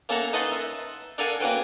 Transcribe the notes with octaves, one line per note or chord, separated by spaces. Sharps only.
A#3 C#4 A4 E5 F#5 A#5
D#4 B4 D#5 F#5 A5 C6
E5
D4 A4 A#4 F5 F#5 G#5
A#3 C#4 F#4 B4 G5